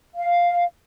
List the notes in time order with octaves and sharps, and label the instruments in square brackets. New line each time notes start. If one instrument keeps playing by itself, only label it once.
[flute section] F5